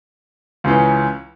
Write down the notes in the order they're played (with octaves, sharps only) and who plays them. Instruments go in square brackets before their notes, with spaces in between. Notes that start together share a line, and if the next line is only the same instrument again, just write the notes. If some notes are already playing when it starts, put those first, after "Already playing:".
[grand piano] C#2 C#3 E3 C#4